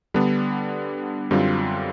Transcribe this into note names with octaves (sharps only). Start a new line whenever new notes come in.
D3 G3 B3 D4
F#2 D3 G3 C4 F4